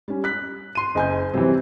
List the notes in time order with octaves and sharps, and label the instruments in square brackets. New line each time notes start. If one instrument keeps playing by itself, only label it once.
[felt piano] G3 C#4
F#6 B6
[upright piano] C6 D#7
[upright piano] F#1 [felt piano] D#5 G#5 G6
[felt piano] C3 F#3 G3 [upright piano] E3 C4